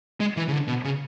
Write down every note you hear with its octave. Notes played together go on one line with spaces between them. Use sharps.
G#3
E3
C#3
D3
B2
C#3